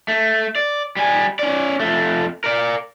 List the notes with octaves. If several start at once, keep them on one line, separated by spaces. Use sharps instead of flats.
A3
D5
G3 G#5
C#4 D5
F2 A3
A#4 D5